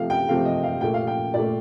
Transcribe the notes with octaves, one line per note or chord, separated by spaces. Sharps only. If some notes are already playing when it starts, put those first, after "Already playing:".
Already playing: C3 F3 A3 F5
G5
C3 F3 A3 F5
D#5
F5
A#2 A3 G5
F5
G5
A#2 A3 D5